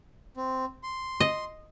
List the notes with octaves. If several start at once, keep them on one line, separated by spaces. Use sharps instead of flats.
C4
C6
D#5